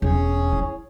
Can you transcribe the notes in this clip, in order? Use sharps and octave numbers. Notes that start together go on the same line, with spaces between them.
E1 E2 C#4 G#4 C#5
E4